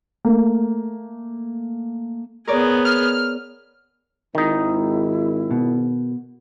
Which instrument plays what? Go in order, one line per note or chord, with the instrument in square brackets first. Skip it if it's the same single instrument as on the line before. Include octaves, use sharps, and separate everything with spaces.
[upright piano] A3 A#3
[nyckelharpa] B3 G#4 [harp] A#4 C#5 D5
[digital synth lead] F6
[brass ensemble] G#1 [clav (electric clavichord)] D#3 D#4 [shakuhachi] E4
[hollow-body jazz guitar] B2